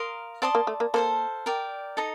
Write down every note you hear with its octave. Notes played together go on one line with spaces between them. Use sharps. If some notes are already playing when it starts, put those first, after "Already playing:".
Already playing: A#4 F5 C6 D#6
C4 D5 A5 C6 D#6
A#3
A3
A#3
A#3 A4 C5 F5
A#4 D5 G5
D#4 A4 D#5 A#5